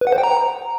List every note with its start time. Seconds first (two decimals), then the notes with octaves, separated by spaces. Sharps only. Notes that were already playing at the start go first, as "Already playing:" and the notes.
0.01 B4
0.07 F#5
0.12 C5
0.18 G5
0.23 A#5